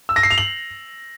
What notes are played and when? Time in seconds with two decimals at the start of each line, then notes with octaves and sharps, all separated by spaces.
0.09 E6
0.16 A#6
0.23 C7
0.30 F7
0.38 F#7